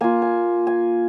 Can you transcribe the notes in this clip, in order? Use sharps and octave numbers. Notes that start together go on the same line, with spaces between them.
A#3 F4 G#5
G#5
G#5